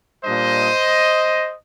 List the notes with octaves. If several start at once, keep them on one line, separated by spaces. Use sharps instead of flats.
A#2 G3 D4 C5 D#5